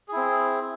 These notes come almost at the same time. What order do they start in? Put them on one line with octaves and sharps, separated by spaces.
G#4 E4 C4